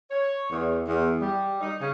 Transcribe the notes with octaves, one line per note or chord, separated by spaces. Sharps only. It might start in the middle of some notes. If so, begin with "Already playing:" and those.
C#5
E2
E2
G3
D#4
C#3